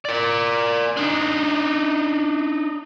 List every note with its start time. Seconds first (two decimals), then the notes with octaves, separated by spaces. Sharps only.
0.05 A#4 D5
0.97 D4 D#4